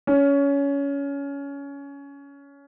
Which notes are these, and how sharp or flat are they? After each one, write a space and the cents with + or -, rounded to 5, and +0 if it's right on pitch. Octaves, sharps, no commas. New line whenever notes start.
C#4 +20